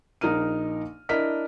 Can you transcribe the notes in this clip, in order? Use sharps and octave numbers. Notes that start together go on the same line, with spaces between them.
A#1 D#4 A#4 F6 D#7
D4 E4 A#4 D#5 F6 B6